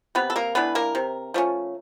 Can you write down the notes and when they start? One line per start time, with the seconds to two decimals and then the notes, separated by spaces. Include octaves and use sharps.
0.15 C3 B3 B4
0.30 A4
0.36 A#3 A#4
0.55 E3 A3 B3 D4 B4
0.75 A#3 A#4
0.95 C3
1.34 F3 A3 C#4